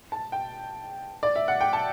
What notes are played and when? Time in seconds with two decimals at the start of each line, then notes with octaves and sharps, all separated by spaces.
0.12 A5
0.32 G5
1.23 D5
1.36 E5
1.48 F#5
1.61 G5
1.73 A5